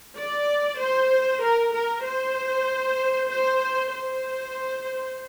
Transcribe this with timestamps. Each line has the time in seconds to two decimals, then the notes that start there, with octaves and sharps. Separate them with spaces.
0.16 D5
0.78 C5
1.41 A#4
1.72 A#4
2.03 C5
3.29 C5
3.91 C5